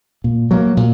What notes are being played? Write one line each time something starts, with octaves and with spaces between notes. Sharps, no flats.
A#2
F#3 A#3
A#2